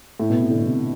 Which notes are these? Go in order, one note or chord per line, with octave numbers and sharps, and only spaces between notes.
A2
B2
C3
D3
B2
C3